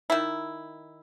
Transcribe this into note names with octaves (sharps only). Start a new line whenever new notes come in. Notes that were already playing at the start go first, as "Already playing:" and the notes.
D#3 E4